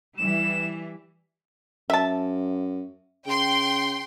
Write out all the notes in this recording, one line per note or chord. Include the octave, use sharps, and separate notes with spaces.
E3 G3 E7
F#2 E5 A5
C#3 G5 C6